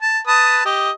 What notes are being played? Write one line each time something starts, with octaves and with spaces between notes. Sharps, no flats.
A5
B4 A5 D#6
G4 D#5